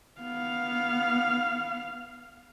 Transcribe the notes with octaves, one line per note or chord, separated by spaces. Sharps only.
B3 F5